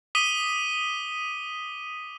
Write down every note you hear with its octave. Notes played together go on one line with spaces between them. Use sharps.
D6 D#6 B6 D#7 G7